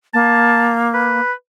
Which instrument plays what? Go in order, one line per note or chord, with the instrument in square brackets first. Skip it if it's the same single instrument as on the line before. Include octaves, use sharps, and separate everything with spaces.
[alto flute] A#3 [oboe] A5
[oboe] B4